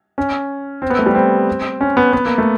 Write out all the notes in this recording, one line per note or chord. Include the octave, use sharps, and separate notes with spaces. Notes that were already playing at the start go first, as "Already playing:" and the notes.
C#4
C4
B3
A3
G3
C4
C#4
B3
B3
A#3
A3